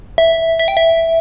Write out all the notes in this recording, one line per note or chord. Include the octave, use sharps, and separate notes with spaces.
E5
E5
G5
E5